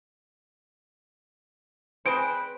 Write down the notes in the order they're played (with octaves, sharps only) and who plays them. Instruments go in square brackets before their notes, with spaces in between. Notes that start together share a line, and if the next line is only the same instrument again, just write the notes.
[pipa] C4 G#4 C5 [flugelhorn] B4 [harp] D7